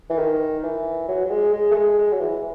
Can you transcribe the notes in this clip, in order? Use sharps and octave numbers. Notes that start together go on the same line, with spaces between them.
E3
D#3
E3
F#3
F#3
G#3
G#3
A3
G#3
G#3
F#3
E3